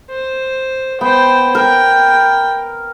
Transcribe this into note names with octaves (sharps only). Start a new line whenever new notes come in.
C5
B3 C5 G5
A#4 G5